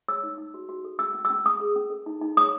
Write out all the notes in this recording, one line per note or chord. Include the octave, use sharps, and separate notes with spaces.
C#5 E6
D#4
D#4
F#4
F#4
A4
C#4 E6
C#4
E6
C#4
C#4 D#6
G#4
C#4
A4
D#4
D#4
C#5 D#6